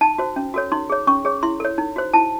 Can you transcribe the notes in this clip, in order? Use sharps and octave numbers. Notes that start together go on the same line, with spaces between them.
D#4 A5
F#4 C5
C#4
F#4 A4 C#5
D#4 C6
G#4 C#5
C#4 C#6
G#4 C#5
E4 C6
A4 C#5
D#4
F#4 C5
E4 A5